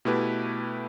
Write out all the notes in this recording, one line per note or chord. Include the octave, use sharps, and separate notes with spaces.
B2 A3 E4 G4 B4